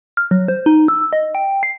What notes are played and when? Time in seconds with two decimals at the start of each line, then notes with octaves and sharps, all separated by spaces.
0.17 F6
0.31 F#3
0.48 C5
0.66 D#4
0.88 E6
1.13 D#5
1.35 G5
1.63 C7